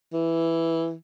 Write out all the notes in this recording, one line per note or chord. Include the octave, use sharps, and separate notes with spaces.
E3